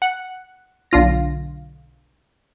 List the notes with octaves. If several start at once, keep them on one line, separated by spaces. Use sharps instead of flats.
F#5
B1 D3 F4 A#6